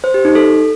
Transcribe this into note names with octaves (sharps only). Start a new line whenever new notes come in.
C5
G4
D#4
A4